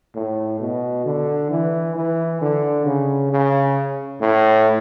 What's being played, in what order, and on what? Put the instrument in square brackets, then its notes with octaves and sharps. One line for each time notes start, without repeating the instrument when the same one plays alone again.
[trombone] A2
B2
D3
E3
E3
D3
C#3
C#3
A2